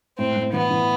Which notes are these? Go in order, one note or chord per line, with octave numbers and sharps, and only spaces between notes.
A2 C4
A2
E3 B3
E3